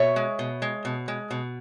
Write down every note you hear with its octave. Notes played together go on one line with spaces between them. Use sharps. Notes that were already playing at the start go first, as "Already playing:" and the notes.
Already playing: B2 C#5 E5
G#3
B2
G#3
B2
G#3
B2